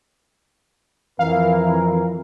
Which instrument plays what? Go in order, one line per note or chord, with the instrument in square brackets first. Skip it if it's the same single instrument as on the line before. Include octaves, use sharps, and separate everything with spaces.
[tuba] F2 [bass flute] E3 [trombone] A#4 [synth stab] F5